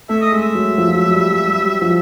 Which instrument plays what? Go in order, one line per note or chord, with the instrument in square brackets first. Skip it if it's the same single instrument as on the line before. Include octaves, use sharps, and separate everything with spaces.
[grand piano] A3 [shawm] E5
[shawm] D#5
[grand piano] G#3 [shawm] E5
[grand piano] F#3
F3
F3
F#3
F#3
G3
F#3
G3
F#3
G3
F3